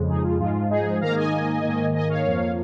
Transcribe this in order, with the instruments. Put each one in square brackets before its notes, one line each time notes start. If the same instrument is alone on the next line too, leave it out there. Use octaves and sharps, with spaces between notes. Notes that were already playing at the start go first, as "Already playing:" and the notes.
Already playing: [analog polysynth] F2 C#3 G#3
D#4 G#4
F4
G#2 F3 G#3 F4
D#4 G#4
G#2 D#3 A#3 F5 A#5
D#5 G#5
G#2 D#3 A#3
D#5 G#5
C#5 F5
F2 F3 A#3